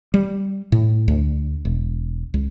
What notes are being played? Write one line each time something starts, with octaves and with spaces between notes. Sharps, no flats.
G3
A2
D2
E1
C#2